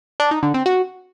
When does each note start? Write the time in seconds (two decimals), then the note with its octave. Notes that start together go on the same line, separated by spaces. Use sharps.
0.20 D4
0.31 D#4
0.43 D3
0.54 C4
0.66 F#4